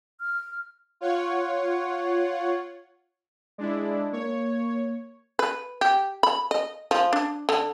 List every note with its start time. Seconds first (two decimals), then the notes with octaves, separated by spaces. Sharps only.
0.21 F6
1.01 F4 C#5 F#5
3.58 G#3 D4 E4 D5
4.13 A#3 C#5
5.39 B4
5.81 G4
6.23 B5
6.51 D#5
6.91 F3
7.13 D4
7.49 D3